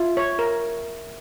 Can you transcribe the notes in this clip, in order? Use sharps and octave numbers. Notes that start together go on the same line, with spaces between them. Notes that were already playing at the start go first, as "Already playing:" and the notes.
Already playing: F4 E5
C#5
A#4